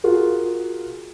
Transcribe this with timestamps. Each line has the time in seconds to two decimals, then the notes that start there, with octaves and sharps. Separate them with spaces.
0.04 F4 F#4 G#4 A#4